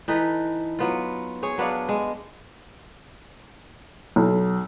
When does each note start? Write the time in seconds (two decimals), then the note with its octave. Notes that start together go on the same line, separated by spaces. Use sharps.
0.08 E3 D#4 A4 B4
0.79 F#3 B3 F4
1.43 G#4 C#5
1.58 F#3 B3 D4 F5
1.89 G#3
4.16 B1